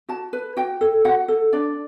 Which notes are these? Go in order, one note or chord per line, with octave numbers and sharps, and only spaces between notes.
F#4 A5
B4
F#4 G5
A4
F#4 F#5
A4
D4 D5